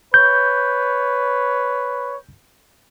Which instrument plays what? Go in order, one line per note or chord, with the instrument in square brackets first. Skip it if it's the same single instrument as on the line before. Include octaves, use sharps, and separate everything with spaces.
[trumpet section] B4 C#5 [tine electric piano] G6